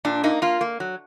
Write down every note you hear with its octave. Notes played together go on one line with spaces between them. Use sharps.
A#2 D4
A#3 D#4
A#3 F4
A#3
F#3